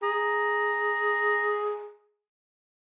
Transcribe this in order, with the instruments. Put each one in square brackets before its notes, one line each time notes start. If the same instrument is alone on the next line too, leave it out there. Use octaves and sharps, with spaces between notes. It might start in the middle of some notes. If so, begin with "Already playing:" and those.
[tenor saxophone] G#4 [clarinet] A#5